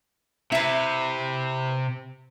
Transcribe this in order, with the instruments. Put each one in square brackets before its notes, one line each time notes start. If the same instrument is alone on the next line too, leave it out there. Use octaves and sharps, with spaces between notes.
[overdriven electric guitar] C3 [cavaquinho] E4 B4